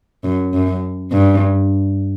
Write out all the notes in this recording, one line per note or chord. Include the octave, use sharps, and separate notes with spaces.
F#2
F#2
G2